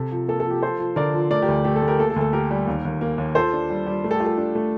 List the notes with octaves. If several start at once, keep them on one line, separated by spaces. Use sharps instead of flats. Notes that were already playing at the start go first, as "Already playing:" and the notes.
Already playing: C3 A4
F3
A#3 A4
A4
F3 G4
F3 A4 C5
F3
D3 A#4 D5
F3
A3 A#4 D5
G4 A#4
D2
A3 G4
A4
A3
G4 A#4
A#3 A4
A4
D2
A4
A#3 G4 A#4
G3
D#2
D#2
A#3
D#2
F4 A4 C5
D4
G3
G3
A3
A4
G4
F4
A4
D4
A3